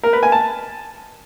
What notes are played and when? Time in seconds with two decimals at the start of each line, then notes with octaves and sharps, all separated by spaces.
0.03 A#4
0.13 B4
0.23 G#5
0.32 A5